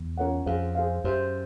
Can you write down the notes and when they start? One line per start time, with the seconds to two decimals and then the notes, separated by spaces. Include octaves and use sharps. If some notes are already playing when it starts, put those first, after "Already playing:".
Already playing: E2
0.18 C#4 F4 A#4 C#5 F#5
0.46 F2 G#4 C5 F5
0.75 G#4 C5 F5
1.04 F#2 G4 C5 E5